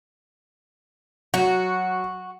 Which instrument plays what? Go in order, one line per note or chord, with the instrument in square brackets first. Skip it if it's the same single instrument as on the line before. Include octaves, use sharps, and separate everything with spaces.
[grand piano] F#3 [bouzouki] F#4